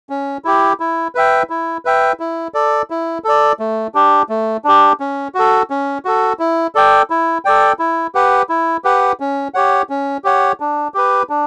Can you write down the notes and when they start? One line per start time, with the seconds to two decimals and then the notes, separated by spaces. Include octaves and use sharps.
0.10 C#4
0.45 E4 G4
0.80 E4
1.15 B4 E5 G5
1.50 E4
1.85 B4 E5 G5
2.20 E4
2.54 A4 D5
2.90 E4
3.24 A4 D5
3.59 A3
3.94 D4 G4
4.29 A3
4.64 D4 G4
5.00 C#4
5.35 F#4 A4
5.70 C#4
6.05 F#4 A4
6.39 E4
6.75 A4 D5 G5
7.10 E4
7.45 A4 D5 G5
7.79 E4
8.15 G4 B4 F#5
8.49 E4
8.84 G4 B4 F#5
9.20 C#4
9.54 G4 C#5 F#5
9.89 C#4
10.24 G4 C#5 F#5
10.60 D4
10.94 G4 B4
11.29 D4